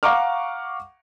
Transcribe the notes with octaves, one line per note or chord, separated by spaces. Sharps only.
F5 F#5 A#5 C#6 D6 F6